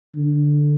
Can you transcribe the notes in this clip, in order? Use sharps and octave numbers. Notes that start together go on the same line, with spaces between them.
D3